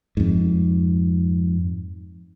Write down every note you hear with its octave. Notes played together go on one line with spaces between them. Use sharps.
F2 G#2